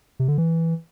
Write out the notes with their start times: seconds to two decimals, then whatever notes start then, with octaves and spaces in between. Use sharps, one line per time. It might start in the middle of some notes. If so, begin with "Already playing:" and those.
0.19 C3
0.28 D3
0.38 E3